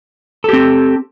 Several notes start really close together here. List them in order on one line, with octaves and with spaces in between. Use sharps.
A4 G4 C4